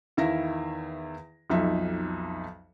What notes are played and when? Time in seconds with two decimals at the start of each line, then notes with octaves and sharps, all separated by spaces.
0.17 E2 D#3 E4 E5 F5 A#6
1.50 B1 F2 D#4 E5